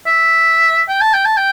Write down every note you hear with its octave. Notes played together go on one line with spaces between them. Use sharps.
E5
G5
A5
G5
A5
G5